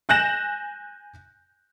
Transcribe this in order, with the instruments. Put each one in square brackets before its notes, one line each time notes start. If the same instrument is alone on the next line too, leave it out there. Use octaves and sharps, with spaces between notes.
[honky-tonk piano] G#5 F#6 G6 A#6 E7 F#7